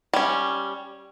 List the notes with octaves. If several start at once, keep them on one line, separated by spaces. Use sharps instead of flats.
G3 C#4